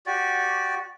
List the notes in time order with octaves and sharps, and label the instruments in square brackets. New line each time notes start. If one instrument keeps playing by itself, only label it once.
[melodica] F#4 G4 D5